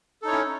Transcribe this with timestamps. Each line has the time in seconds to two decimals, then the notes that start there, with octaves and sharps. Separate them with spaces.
0.22 A4
0.25 D#4
0.27 C#5
0.30 E4
0.33 C#4